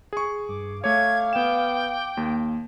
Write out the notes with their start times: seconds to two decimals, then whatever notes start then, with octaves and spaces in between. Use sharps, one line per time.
0.13 G#4 C#6
0.48 G2 D6
0.84 A3 C#5 F5 D6 G#6
1.33 B3 G5 E7
2.17 D#2 A#3